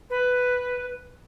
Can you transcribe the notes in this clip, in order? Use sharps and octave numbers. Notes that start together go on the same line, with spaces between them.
B4